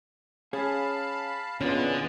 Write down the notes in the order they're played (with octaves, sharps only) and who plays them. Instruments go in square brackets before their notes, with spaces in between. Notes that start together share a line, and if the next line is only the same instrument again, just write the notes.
[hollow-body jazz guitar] C#4 G#4 [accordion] F5 A5 B5
[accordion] E2 A#2 G#3 [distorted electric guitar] D3 [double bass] B3 [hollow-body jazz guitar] C#4 F4